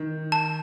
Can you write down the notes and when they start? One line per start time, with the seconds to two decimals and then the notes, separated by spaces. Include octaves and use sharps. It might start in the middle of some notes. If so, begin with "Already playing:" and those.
Already playing: D#3
0.32 A5